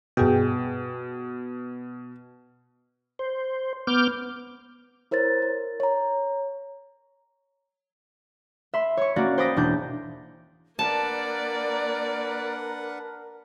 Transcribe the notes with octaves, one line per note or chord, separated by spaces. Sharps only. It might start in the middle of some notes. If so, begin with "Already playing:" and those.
G2 B2 G#4 G5
C5
B3 D6 F6 G6
E4 A#4 C5 C#5 A6
A#4
C#5 A#5
E5 B5 C6
C#5 C#6
A#3 C#4 F#4 D5
C5 D5 G5 B5 D#6 A#6
E1 D4 G6
A#3 D4 A#4 B4 D5 F#5 A5